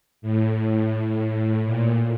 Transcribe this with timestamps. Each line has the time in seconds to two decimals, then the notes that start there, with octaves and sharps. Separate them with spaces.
0.22 A2
1.08 A2
1.65 A#2